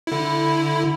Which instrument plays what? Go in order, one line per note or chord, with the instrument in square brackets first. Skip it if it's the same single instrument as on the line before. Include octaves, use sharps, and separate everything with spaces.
[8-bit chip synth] D3 E4